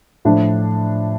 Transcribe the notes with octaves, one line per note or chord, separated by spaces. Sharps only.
A2 F3 A3 D4